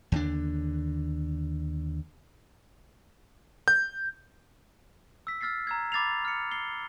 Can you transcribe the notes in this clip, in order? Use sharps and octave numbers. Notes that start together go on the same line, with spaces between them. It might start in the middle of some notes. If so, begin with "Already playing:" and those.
D#2 D3 D4
G6
E6 B6
E6 F6 A6 B6 C7
A#5 E6 G#6
B5 D6 A6 C7 F7
F6 C#7
C7 G7